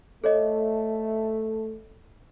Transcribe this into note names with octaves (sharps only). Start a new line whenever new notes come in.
A3 A4 C#5 D#5